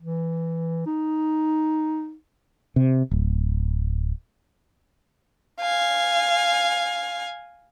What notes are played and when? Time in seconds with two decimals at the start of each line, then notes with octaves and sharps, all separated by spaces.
0.01 E3
0.86 D#4
2.76 C3
3.11 D1
5.60 F5 G#5